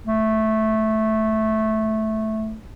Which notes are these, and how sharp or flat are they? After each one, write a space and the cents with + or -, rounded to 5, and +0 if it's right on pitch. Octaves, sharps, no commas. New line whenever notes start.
A3 -10